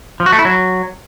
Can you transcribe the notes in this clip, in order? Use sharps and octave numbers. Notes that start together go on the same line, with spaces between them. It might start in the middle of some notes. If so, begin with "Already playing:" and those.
F3
F#4
A3
E4
F#3